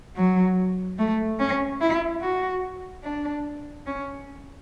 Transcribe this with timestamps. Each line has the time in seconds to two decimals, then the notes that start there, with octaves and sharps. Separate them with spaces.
0.17 F#3
0.99 A3
1.39 C#4
1.81 E4
2.22 F#4
3.03 D4
3.87 C#4